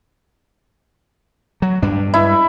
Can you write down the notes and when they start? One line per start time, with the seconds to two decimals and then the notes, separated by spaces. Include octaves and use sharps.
1.62 F#3
1.82 G2 D4
2.14 E4